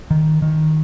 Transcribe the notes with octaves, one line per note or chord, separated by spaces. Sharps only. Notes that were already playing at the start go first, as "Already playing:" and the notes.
D#3
D#3